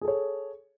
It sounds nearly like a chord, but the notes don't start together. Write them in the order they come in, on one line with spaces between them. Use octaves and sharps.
G#4 A4 C#5